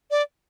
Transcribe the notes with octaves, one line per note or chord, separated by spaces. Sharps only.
D5